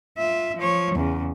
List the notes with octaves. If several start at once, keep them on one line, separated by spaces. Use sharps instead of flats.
F4 E5
F3 C#5
E2 C#3